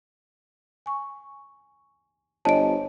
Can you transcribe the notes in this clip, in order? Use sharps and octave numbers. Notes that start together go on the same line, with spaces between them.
G#5 C#6
G1 C5 C#5 D#5 G#5 A5 D7